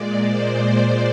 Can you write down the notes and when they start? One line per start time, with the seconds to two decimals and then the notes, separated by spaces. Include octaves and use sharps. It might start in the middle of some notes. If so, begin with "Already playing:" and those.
Already playing: A#2 G#3 D5
0.21 C5